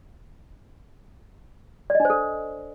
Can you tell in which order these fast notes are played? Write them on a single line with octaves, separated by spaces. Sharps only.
D5 D#5 D4 C5 A4